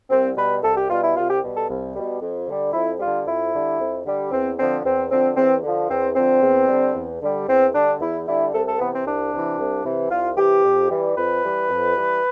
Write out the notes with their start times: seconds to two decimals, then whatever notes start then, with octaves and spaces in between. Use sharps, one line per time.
0.10 C2 C4
0.37 B2 G3 B4
0.63 C2 A4
0.76 G4
0.90 B2 G3 F4
1.02 E4
1.16 C2 F4
1.29 G4
1.42 B2 G3
1.55 A4
1.69 C2
1.95 B2 G3
2.21 F2
2.47 D3 G3
2.73 F2 E4
3.00 D3 G3 F4
3.26 F2 E4
3.53 D3 G3
3.79 F2
4.05 D3 G3
4.31 E2 C4
4.58 D3 F3 C4
4.84 E2 C4
5.10 D3 F3 C4
5.37 E2 C4
5.63 D3 F3
5.89 E2 C4
6.16 D3 F3 C4
6.42 E2
6.68 D3 G3
6.95 E2
7.22 D3 G3
7.47 E2 C4
7.73 D3 G3 D4
8.00 E2 E4
8.26 D3 G3 E4
8.53 C2 A4
8.66 A4
8.79 C3 E3 B3
8.92 C4
9.05 C2 D4
9.32 C3 E3
9.59 C2
9.84 C3 E3
10.10 C2 F4
10.37 C3 E3 G4
10.63 F2
10.90 E3 G3
11.16 F2 B4
11.42 E3 G3
11.69 F2
11.95 E3 G3